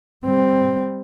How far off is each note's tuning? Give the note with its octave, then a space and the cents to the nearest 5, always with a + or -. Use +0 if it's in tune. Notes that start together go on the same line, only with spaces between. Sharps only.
G3 +20 C4 +0